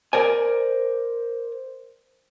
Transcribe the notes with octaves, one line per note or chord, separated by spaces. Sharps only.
A#4 C5 D5 G#5